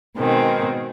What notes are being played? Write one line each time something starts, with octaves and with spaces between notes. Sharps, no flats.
B2 D#3 G#3 C4